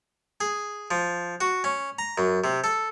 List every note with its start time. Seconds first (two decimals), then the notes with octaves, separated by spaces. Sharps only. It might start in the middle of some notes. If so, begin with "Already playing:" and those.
0.41 G#4
0.91 F3
1.41 F#4
1.64 C#4
1.99 A#5
2.18 F#2
2.44 C3
2.64 A4